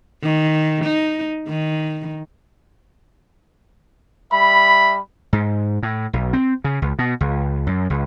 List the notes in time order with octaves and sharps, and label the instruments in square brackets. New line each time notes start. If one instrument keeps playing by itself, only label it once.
[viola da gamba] D#3
D#4
D#3
[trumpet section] G3 E5 B5
[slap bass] G#2
A2
B1
C4
C#3
C#2
B2
C#2
F#2
C#2